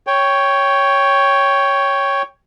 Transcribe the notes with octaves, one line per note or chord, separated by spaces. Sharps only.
C#5 G5